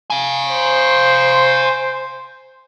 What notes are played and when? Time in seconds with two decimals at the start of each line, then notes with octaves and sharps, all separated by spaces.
0.10 F5 G#5
0.48 C5